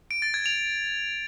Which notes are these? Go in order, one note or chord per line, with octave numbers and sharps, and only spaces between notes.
D7
A6
G#6
F7